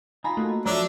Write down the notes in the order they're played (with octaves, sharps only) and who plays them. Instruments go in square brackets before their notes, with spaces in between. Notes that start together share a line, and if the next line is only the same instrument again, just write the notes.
[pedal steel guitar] D#4 F4 [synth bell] G#5 A#5 B5
[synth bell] A3 A#3 F#4
[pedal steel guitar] F3 A3 [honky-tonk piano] F#3 C#5 E5 [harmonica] D4 [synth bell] A#5 E6